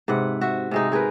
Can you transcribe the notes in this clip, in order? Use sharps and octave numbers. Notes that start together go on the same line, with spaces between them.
G#2 C3 B4 F#5
F#4 E5
C3 G#3 D#4
G#3 G#4 A#4 B4